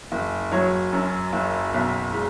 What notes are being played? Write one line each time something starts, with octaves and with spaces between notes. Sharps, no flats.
F#1
F#3 C#5
F#2
F#1
B1
G#3